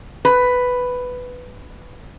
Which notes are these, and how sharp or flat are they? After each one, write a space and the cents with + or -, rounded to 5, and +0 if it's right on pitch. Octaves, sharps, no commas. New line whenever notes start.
B4 +5